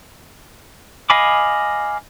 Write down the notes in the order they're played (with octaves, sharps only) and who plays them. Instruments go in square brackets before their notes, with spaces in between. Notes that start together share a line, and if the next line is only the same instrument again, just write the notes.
[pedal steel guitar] D#5 F5 G#5 B5 D6